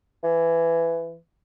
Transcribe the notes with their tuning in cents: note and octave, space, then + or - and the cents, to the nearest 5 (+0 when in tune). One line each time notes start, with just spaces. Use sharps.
E3 +15